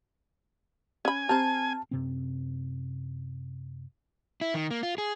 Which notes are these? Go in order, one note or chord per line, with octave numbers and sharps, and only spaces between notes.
C#4 G#5 B5
C4 G4 C5 A5 A#5 F6
F#2 C3 C4
E4
D#3
A#3
F4
G#4